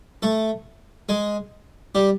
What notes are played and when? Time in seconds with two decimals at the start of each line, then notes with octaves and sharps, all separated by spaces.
0.23 A3 A4
1.09 G#3 G#4
1.95 G3 G4